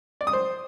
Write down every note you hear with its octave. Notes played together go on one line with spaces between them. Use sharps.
D5
D#6
C5